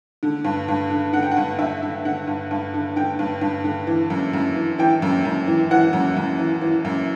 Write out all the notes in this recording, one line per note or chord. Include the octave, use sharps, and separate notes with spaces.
D3
G2
G2
D3
D3 F#5
G5
F#5
G2
G2 E5
D3
D3 F#5
G2
G2
D3
D3 G5
G2
G2
D3
E3
F#2
F#2
E3
E3 G5
F#2
F#2
E3
E3 F#5
F#2
F#2
E3
E3
F#2